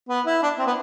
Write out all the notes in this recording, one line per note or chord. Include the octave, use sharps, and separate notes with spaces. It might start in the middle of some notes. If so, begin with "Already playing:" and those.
B3
E4
D4
C4
B3